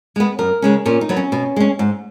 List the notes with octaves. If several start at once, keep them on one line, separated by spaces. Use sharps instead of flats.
G#3 B3
F#2 A#4
C#3 G#3 C#4
A#2 C#4
D#4
F#3 B3
C#4
B2
G#3 C#4
G#2